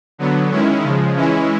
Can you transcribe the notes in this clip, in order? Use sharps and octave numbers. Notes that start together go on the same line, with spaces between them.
D3 F#3 B3
D#3 G#3 C#4 E4
C#3 F3 G#3
E3 G#3 C#4 E4